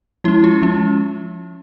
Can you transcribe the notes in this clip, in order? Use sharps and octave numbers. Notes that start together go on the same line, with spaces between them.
F3 G#3 C#4 E4
F4
F3 G#3 C#4